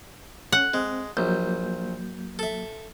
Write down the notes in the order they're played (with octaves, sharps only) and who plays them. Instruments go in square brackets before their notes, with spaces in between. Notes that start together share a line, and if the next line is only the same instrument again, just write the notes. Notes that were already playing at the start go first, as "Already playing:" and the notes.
[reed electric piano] C#4 [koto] F#5
[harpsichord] G#3 [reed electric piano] C4
[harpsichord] A#1 [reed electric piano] F#3 A#3 G6
[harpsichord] A4 E5